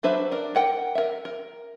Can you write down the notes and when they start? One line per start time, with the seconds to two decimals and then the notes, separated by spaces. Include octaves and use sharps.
0.03 F#3 D4 B4 C5 E5
0.31 D4 A#4
0.55 A#4 F#5 G5
0.95 A#4 E5
1.25 A#4